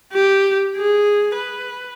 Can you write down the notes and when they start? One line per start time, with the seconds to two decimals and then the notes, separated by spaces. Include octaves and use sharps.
0.14 G4
0.77 G#4
1.35 B4